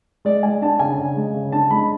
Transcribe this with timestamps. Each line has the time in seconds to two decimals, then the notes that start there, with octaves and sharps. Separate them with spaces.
0.25 G#3 D5
0.43 G#3 G#5
0.62 D4 A5
0.79 C#3 G#5
0.98 C#3
1.16 G#3
1.34 C#3
1.52 D4 A5
1.71 G#3 B5